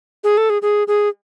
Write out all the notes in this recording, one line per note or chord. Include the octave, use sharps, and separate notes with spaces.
G#4
A4
G#4
G#4
G#4